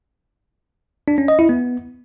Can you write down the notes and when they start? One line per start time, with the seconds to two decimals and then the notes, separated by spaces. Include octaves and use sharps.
1.08 D4
1.18 C#4
1.28 D#5
1.39 E4
1.49 B3